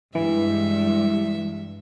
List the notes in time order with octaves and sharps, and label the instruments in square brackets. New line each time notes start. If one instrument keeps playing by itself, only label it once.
[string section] G2 [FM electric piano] E3 [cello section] G#3 [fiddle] E5